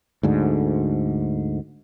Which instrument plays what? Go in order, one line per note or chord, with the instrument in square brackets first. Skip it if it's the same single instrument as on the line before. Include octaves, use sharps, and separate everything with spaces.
[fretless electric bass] D2 G#2 D3